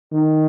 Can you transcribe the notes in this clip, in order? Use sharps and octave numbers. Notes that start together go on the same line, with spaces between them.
D#3